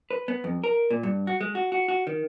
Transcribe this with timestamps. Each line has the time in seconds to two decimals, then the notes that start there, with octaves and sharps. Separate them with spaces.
0.11 B4
0.28 B3
0.44 F2
0.64 A#4
0.90 A#2
1.03 G2
1.27 F#4
1.41 G#3
1.55 F#4
1.72 F#4
1.88 F#4
2.07 D#3